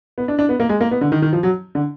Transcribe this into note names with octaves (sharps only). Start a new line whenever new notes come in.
B3
D4
D4
B3
A#3
G#3
A#3
B3
D3
D#3
D#3
F3
F#3
D3